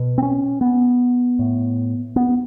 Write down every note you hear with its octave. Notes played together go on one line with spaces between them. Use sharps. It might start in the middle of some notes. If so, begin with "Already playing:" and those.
Already playing: B2
C4
C#4
B3
A2
B3